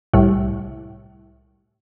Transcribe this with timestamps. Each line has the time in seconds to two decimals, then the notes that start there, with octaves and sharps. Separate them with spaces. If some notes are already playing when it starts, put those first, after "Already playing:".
0.13 C2 A2